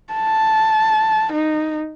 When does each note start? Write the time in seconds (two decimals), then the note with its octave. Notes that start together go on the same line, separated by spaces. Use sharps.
0.14 A5
1.33 D#4